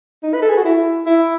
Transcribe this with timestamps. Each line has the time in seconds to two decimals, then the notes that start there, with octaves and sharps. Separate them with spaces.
0.23 D#4
0.33 B4
0.42 A4
0.49 G#4
0.57 F#4
0.64 E4
1.06 E4